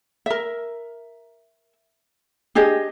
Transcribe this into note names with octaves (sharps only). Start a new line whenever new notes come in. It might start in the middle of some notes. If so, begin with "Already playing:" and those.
A#4 E5
D4 G4 G#4 D#5